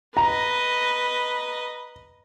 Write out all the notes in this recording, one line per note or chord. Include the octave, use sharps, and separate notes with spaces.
B4 D#5 A#5